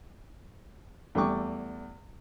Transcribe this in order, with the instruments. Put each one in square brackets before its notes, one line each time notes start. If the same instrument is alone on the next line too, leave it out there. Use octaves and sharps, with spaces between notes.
[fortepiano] E2 G3 A3 G5 C#6 D6